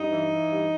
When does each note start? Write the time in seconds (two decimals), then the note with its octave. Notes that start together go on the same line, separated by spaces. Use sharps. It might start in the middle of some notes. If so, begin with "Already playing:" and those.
Already playing: G2 D#4
0.10 E3
0.29 E3
0.49 G2